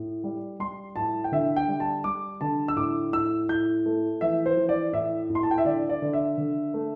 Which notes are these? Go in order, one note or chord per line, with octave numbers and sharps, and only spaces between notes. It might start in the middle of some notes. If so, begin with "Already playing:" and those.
Already playing: A2
G3
G3 C6
A2 A5
G5
D3 E5
G5
G3
A5
G3 D6
D3 A5
E6
A2 D6
A2 E6
A2 G6
A3
E3 E5
C5
E3
D5
A2 E5
A2
C6
A5
G5
E5
D3 D5
D5
D3
E5
D3
A3